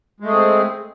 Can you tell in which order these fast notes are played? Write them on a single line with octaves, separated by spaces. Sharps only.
G#3 A3 G#4 C4